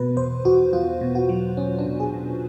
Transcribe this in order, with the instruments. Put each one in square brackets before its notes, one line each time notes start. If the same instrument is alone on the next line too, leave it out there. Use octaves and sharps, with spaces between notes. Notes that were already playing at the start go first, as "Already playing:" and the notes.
Already playing: [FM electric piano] B2 B4
E2 C5
E2 F#4
E2 F4
B2
F#4
F#3
E2 C#4
D4
B2
G#4
B2